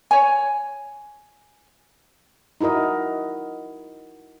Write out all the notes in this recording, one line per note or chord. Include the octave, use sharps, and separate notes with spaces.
C#5 G#5
D#4 E4 F#4 A#4 D#5